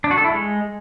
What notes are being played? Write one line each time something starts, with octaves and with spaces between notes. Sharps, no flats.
D4
F#4
A4
E4
G#3